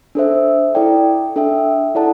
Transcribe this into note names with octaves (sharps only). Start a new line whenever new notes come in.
D4 A4 C5 E5
E4 A4 D5 G5
D4 A4 E5 G5
E4 A4 D5 F#5 A5